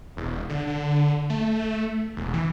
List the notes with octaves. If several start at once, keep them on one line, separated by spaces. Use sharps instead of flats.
E1
D3
D3
A3
E1
E3